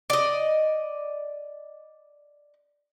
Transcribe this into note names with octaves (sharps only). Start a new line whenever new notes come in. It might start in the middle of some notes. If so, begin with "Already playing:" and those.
D5 D#5